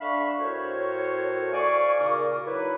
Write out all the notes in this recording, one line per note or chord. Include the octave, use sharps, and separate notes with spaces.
D3 D4 E5 F5 B5 C#6
A2 F#4 A#4 C5 C#5
D5 F5 G#5 C#6
A#2 C#3 D#4 F#4 A#4 D6
F#3 D#4 E4 B4